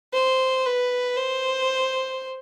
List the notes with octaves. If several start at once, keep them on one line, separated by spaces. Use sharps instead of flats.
C5
B4
C5